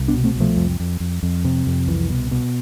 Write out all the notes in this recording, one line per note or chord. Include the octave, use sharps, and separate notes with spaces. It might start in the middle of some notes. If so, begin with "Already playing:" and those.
Already playing: C2
B3 D4
B2
A3 C4
C2
F3 A3
F2
F2
F2
F2
C3
F2
C2 E3
B2
B2